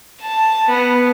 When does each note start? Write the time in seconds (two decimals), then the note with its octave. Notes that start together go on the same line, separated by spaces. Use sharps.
0.21 A5
0.69 B3